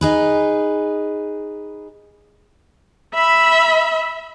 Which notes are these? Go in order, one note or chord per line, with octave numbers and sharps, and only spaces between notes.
D#4 G#4 B4
E5 B5